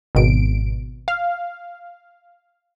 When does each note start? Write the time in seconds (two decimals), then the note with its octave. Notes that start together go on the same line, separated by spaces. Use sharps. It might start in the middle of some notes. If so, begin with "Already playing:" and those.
0.15 G#1 B2 D7
1.08 F5